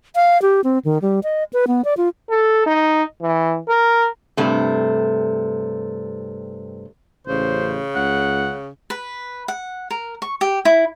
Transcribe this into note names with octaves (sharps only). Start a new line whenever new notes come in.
F5
G4
C4
D#3
G3
D#5
B4
B3
D5
F4
A4
D#4
E3
A#4
G2 C3 A3
A1 C#3 C5
C#2 F#5
B4
F#5
A#4
C#6
G4
E4